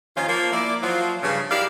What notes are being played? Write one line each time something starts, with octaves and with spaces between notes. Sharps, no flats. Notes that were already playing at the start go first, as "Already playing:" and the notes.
D#2 D#3 F3 C#4 F4
F3 A#3
A#3 E4 D5
F3 F#3 F4
G2 C#3
D#4 E4 G4 A#4 D5 F5